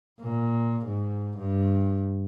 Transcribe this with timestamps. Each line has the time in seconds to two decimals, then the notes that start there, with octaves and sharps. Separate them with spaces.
0.20 A#2
0.85 G#2
1.37 G2